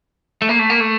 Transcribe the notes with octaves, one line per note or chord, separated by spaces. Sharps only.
A3
A#3
A3
A#3
A3